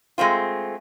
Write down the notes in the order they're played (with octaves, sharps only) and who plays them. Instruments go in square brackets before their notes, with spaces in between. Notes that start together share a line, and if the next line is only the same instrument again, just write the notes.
[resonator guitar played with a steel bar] G#3 A3 C4 F4